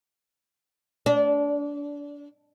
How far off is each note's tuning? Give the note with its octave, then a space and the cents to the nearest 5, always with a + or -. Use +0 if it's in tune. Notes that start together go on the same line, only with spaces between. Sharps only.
D4 -25